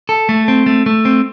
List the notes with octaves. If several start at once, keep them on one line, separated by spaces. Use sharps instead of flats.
A4
A3
C4
A3
A3
C4